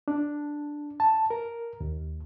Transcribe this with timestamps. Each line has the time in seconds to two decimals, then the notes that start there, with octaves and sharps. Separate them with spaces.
0.08 D4
1.00 A5
1.30 A#4
1.81 D#2